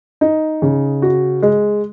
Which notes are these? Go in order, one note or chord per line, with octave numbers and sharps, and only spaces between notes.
D#4
C#3
F#4
G#3